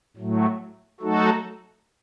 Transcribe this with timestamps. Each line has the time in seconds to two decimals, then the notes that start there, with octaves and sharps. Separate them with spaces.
0.17 A2 F#3 A3
1.01 F#3 A3 D#4 F#4 A4